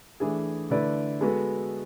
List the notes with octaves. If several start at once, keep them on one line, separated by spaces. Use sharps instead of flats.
E3 A3 D4 G#4
D3 A3 E4 B4 D5
G#3 B3 F#4 A4